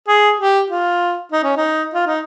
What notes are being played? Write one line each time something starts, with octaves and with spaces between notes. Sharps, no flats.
G#4
G4
F4
D#4
C#4
D#4
F4
D#4